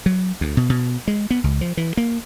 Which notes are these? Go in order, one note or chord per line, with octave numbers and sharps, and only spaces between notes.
F#3
D2
B2
B2
G#3
B3
C#2
F3
E3
A#3